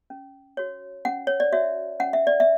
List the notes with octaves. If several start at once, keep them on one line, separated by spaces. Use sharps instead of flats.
C#4
F#4 C#5
C#4 F#5
C#5
D5
F#4 C#5 E5
C#4 F#5
E5
D5
E5